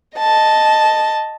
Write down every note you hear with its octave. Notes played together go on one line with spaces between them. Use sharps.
D#5 A5